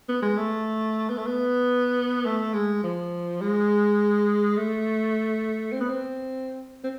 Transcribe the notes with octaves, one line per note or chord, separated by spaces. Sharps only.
B3
G#3
A3
B3
A3
B3
A3
G#3
F3
G#3
A3
C4
B3
C4
C4